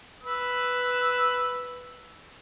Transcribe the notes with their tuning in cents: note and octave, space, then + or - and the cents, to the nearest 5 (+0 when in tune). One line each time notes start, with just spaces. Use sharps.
B4 +0 E6 +0